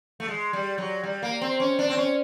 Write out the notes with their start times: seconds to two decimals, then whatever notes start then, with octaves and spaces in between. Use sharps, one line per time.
0.20 A3
0.28 G#3
0.53 G3
0.78 F#3
1.03 G3
1.22 A#3
1.41 C4
1.60 C#4
1.79 D4
1.89 C4
1.97 C#4